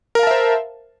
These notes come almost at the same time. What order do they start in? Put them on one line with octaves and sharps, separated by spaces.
A#4 F5 A5 E5 C5